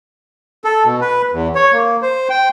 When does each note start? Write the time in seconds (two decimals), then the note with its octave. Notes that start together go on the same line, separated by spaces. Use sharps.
0.64 A4
0.85 B2
1.01 B4
1.32 E2
1.55 C#5
1.72 A#3
2.02 C5
2.30 G5